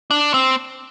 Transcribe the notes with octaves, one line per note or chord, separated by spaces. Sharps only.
D4
C4